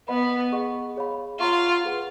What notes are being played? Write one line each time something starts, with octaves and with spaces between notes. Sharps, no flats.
B3 B4 D#5 F#5 B5
G#4 D#5 F#5 C#6
G#4 C#5 F5 B5
F4 C#5 F#5 A#5 C#6
F4 G#4 B4 F#5